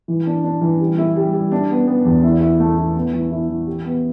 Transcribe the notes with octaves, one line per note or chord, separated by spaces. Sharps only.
E3
D4
D4
E3
G3
E4
G3
G3
D4
B3
B3
E2
E4
E4
A3
E4
B3
E3
E4
E3
G4
B3